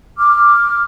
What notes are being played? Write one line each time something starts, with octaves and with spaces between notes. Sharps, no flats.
D6 F6